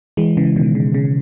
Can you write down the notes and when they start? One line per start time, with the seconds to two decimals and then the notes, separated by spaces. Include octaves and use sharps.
0.17 E3 G#3
0.37 C#3 E3
0.56 B2 D#3
0.75 C#3
0.94 C#3